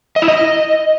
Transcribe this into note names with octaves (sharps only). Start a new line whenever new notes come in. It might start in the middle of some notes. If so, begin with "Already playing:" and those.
D#5
E4
D#5